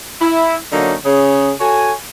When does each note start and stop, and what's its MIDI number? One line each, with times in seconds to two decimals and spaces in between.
0.22 0.56 64
0.72 0.95 50
0.72 0.95 54
0.72 0.95 58
0.72 0.95 61
0.72 0.95 63
1.05 1.53 49
1.05 1.53 61
1.05 1.53 68
1.60 1.93 66
1.60 1.93 69
1.60 1.93 73
1.60 1.93 80